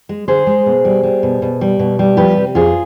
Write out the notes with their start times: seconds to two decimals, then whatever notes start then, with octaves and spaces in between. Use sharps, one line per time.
0.09 G#3
0.28 D3 G#4 C5
0.47 G#3
0.66 B2
0.85 G3
1.03 G3
1.23 B2
1.42 B2
1.61 G3
1.79 B2
1.99 G3
2.17 F3 G4 B4
2.37 C3
2.55 F2 F4 G#4